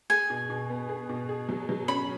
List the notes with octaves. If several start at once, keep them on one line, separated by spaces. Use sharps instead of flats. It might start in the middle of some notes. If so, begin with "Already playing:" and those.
G#4 G#5
B2
B2
B3
G#4
B2
G#4
F#3
F#3
C#4 B5